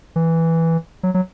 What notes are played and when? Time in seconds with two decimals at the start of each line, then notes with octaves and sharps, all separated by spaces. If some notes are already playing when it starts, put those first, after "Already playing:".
0.16 E3
1.03 F#3
1.14 F#3